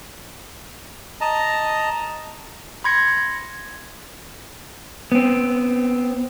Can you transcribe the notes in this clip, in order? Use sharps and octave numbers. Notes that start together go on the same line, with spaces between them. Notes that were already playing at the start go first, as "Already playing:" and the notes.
D#5 A5 A#5
B5 C6 G#6 A#6 C#7
B3 C4